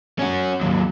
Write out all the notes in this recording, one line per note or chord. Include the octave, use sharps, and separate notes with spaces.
C#4 F#4
D#2 F#3